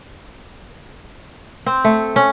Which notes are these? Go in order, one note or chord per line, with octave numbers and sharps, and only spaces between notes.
C4
A3
C#4